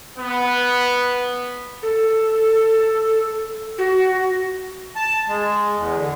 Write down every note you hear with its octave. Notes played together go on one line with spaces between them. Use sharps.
B3
A4
F#4
A5
G#3
E2
D3